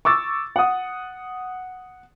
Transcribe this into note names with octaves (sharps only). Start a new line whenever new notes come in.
C#6 D6 E6 A6
F#5 D#6